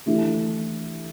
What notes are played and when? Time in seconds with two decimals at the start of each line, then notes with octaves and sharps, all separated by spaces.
0.06 E3 A3 D4 G4